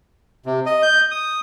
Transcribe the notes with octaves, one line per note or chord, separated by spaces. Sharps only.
C3
D#5
G6
D#6